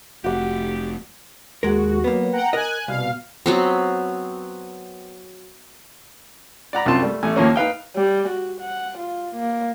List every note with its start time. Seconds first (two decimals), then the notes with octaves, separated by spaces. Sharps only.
0.24 F1 A3 F#4 G4 D6
1.63 D#2 G#3 F#4 A#4
2.04 F#3 A#3 B3
2.32 F#5 G5 A#5
2.53 A#4 D#5 G#5 F#6
2.88 C2 B2 F5
3.46 F#3 B3 C4
6.73 D5 F#5 A#5 B5
6.86 C2 F#2 C4 F4 A5 C6
7.03 G3 A3
7.23 A1 A3 G#5
7.36 D#2 F3 A#3 C#4
7.56 D#4 B4 F5 G5
7.96 G3
8.29 F#4
8.61 F#5
8.98 F4
9.35 A#3